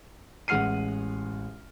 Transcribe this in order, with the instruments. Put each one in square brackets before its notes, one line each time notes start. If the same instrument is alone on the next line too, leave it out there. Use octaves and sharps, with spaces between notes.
[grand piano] A1 G#3 F#5 F6 C7 D#7